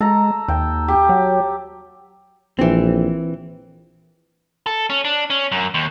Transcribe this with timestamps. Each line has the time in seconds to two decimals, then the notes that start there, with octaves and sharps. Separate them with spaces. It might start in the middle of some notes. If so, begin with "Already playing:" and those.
0.01 G#3 A4 A#5
0.48 D#2 G5
0.88 G4
1.09 F#3
2.59 A#1 E3 C4
4.66 A4
4.90 C#4
5.05 D4
5.30 C#4
5.52 F#2
5.74 D#2